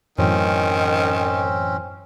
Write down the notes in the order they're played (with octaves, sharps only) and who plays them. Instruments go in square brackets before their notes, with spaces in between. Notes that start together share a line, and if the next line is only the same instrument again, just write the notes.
[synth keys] F#2 A2 E3 [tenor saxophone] D#3 [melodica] C4 C#4